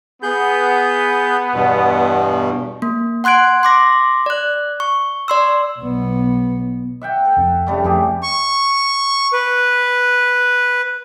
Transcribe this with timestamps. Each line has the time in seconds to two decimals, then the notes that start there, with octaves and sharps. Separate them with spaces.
0.23 B3 G#4 G6
1.54 E2 G2 B2
2.82 A#3
3.24 F#5 C6 F#6 G#6 D7
3.63 C6 D6 A#6
4.26 D5 F#6
4.80 C#6
5.28 D5 C6 E6
5.79 B1 B3
7.01 E5 F#5 G5
7.25 A4
7.37 F1 F2
7.67 C#3 G3 A3
7.84 F2 E3 G4 G#4
8.23 C#6
9.33 B4